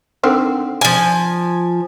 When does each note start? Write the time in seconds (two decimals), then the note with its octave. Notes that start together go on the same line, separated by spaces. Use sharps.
0.23 D3 D#3 C4
0.81 F3 G#5